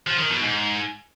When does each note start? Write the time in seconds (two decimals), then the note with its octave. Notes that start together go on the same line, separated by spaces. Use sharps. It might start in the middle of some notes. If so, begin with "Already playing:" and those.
0.07 F3
0.18 D#3
0.30 B2
0.42 G#2